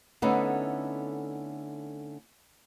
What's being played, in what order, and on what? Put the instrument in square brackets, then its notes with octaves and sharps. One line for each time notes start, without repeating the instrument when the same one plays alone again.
[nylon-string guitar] D3 A3 B3 C#4 D#4 E4